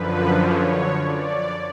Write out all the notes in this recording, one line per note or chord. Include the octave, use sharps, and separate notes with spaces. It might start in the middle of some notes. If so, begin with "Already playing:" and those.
Already playing: F#2 D3 F3 B4
C#5
D5